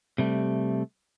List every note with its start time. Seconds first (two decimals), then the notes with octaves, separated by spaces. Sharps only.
0.18 C3 G3 A3